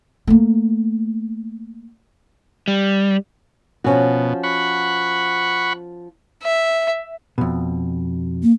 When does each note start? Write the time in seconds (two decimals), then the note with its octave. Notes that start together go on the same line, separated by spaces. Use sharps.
0.27 A3 A#3
2.68 G3
3.84 B2 F3 C#4 F#4
4.44 F#5 B5 C#6
6.43 E5
7.38 F2 B2
8.43 A#3